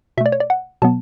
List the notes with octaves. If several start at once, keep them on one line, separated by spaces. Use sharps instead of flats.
B2 A3 D5 E5
C#5
D5
F#5
B2 F#3 B3 A5